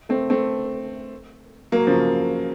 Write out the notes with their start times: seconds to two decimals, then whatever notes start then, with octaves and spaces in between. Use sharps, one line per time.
0.09 A3 C4
0.30 A3 C4
1.72 F#3 A#3
1.87 C#3 F3